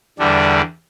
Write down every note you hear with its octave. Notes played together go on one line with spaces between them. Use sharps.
E2 D3 G3 D4